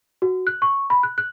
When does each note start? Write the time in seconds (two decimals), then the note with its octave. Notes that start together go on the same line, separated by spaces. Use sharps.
0.22 F#4
0.47 F#6
0.62 C#6
0.90 B5
1.03 F#6
1.18 F#6